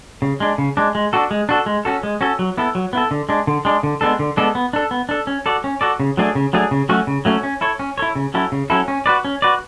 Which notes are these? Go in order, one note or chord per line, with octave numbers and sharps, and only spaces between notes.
C#3
G#3 D4
C#3
G#3 D4
G#3
D4 F#4 A4
G#3
D4 F#4 A4
G#3
C#4 F#4 A4
G#3
C#4 F#4 A4
F#3
B3 E4 A4
F#3
B3 E4 A4
D3
G#3 D4
D3
G#3 D4
D3
G#3 B3 D4 A4
D3
G#3 B3 D4 A4
B3
D4 A4
B3
D4 A4
C#4
F#4 A4 D5
C#4
F#4 A4 D5
C#3
F#3 A3 D4 G#4
C#3
F#3 A3 D4 G#4
C#3
F#3 A3 C#4 F#4
C#3
F#3 A3 C#4 F#4
C#4
E4 A4 C#5
C#4
E4 A4 C#5
C#3
F#3 C#4 E4 A4
C#3
F#3 C#4 E4 A4
C#4
F#4 B4 D5
C#4
F#4 B4 D5